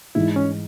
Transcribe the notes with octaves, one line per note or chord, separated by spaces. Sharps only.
G#2 E3 G#3 E4
C#4